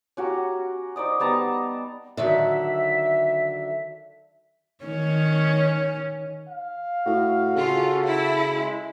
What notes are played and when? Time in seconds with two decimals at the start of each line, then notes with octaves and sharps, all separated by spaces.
0.17 C#4 F#4 G4 A#4
0.96 D#4 C5 D5 D#6
1.20 G3 B3 A5 A#5
2.17 D3 D#3 F#3 E5
4.85 D#3 C#4 C#5
6.49 F5
7.06 A2 F#4
7.56 C#3 C#4 F4 A4
8.05 E4
8.54 G#3